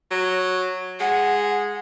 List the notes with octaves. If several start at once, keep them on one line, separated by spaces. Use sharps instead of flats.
F#3
G#3 F#5